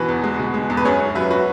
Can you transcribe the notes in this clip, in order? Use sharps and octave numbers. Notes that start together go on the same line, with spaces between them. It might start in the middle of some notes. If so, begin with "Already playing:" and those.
Already playing: B2 E3 F#4 B4
E2
G#3
B2
G#3
E2
B4
F#2 G#4 C#5
F#2
F#3 B4 E5
F#4 B4